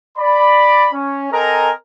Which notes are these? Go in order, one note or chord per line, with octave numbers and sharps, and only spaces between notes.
D5 B5
C#4
C4 A4 A#4 D#5 G#5 A#5